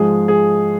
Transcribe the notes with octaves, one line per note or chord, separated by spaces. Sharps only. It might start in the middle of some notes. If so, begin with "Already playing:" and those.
Already playing: G#2 F3 G#3 G#4
G#4